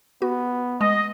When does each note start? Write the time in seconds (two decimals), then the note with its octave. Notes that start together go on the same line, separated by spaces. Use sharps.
0.22 B3 F#4
0.81 G#3 D#5